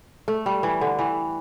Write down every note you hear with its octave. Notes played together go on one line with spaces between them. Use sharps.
A3
G3
E3
D3
E3